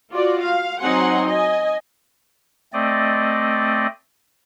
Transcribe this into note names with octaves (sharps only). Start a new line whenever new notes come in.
F4 F#4 D5
F5
F#3 C4 D#4 F#5 G#5 C6
D#5 G#5
A3 C4 D5 D#5